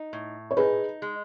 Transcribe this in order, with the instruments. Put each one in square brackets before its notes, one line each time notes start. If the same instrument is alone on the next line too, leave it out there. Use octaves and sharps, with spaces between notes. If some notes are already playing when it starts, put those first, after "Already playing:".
Already playing: [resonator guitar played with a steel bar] D#4
A2
[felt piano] C#5
[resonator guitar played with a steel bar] D#4 [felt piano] G#4 B4
[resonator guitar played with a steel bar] G#3